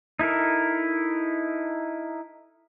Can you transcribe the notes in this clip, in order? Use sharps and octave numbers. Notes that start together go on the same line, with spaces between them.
D#4 E4 A4 A#4